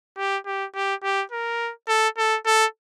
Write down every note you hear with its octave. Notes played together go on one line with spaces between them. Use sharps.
G4
G4
G4
G4
A#4
A4
A4
A4